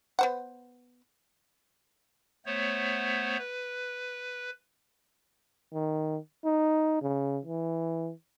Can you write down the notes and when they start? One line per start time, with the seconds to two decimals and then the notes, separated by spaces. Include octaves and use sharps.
0.19 B3 C5 F#5
2.46 A3 B3 C5 C#5
3.39 B4
5.73 D#3
6.45 D#4
7.02 C#3
7.46 E3